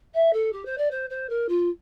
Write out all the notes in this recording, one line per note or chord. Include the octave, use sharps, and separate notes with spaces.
E5
A4
G4
C5
D5
C5
C5
A#4
F4